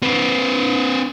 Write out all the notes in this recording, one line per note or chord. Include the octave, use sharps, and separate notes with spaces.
C4 B4